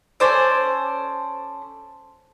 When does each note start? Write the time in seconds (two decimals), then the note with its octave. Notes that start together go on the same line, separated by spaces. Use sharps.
0.20 C#4 A4 C5 D5